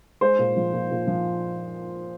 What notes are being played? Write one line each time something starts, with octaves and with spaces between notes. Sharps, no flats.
G#3 C5
A#2
F3
A#2
A#2
F3